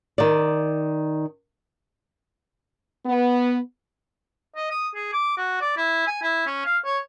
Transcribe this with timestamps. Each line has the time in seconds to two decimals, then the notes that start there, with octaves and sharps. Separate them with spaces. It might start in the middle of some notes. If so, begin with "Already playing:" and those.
0.18 D#3 D5
3.06 B3
4.56 D#5
4.71 D#6
4.95 G#4
5.13 D6
5.38 F#4
5.61 D5
5.77 E4
6.07 G#5
6.22 E4
6.47 C#4
6.65 F5
6.85 C#5